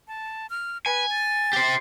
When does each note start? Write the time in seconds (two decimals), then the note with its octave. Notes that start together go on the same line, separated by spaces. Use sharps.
0.08 A5
0.50 F6
0.86 B4 G#5
1.10 A6
1.53 G4 C5